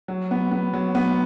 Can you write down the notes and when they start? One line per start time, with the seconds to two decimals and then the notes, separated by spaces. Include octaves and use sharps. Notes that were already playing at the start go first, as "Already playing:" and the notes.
0.08 F#3
0.31 B3
0.51 B3
0.73 F#3
0.95 B3